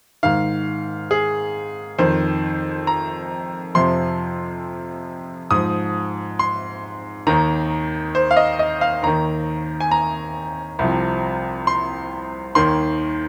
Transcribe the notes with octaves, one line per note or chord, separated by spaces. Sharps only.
G#2 D#3 F5
G#4
F2 D#3 C5
A#5
F2 C3 F3 C6
G#2 F3 D#6
C6
D#2 D#3 A#5
C5
F5
D#5
D#5
F5
D#2 D#3 A#5
G#5
A#5
C2 C3 F3
C6
D#2 D#3 C6